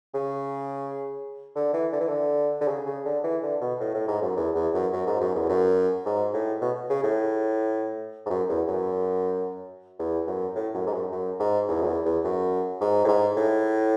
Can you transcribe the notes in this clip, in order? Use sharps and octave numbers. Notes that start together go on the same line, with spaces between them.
C#3
D3
E3
D3
E3
D3
D3
C#3
C#3
D3
E3
D3
B2
A2
A2
G#2
F#2
E2
E2
F#2
F#2
G#2
F#2
E2
F#2
G#2
A2
B2
C#3
A2
G#2
F#2
E2
F#2
E2
F#2
A2
F#2
G#2
F#2
F#2
G#2
E2
F#2
E2
E2
F#2
G#2
A2
G#2
A2